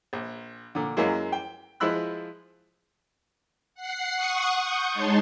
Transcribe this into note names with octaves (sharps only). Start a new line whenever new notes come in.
A#1
A#2 D3
F#2 F#3 G#3 A#3 E4
G5
F3 G#3 E4 B5 E6 F#6
F#5 C7
F#5 C#6 D#6
C#6 D#6 G6
G#3 D#4 C#5 A5 C6